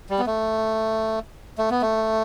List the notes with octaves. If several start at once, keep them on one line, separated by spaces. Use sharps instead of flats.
G3
B3
A3
A3
B3
A3